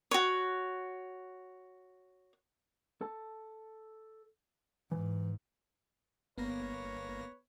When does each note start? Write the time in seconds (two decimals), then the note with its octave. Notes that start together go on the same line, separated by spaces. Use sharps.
0.11 F#4 C#5
3.01 A4 A5
4.91 G#2 E3
6.38 G1 A#3 B3 B4 C#5 A#6